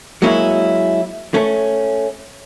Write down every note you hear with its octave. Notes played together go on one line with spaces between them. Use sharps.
F#3 G#3 A#3 C#4 E4
A3 C#4